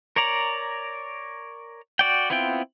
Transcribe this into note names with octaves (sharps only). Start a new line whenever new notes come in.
A#4 C#5 D5 A#5
F#4 D5 G5
B3 C4 E4 F4 G5